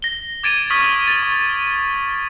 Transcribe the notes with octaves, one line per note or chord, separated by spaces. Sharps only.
A#6 G7
D6 G#6 A6 D7 D#7 F7
C#6 D#6 F6 B6 F#7
A6
C#6